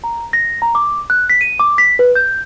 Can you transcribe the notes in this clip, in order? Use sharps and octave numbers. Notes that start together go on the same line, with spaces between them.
A#5
A#6
A#5
D6
F#6
B6
D#7
D6
B6
B4
G6